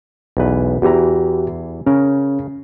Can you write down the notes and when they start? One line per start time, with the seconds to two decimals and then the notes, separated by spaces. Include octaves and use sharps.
0.37 B1 E2 B4
0.82 E2 E3 F#4 G4 A#5
1.86 C#3 C#4 A#4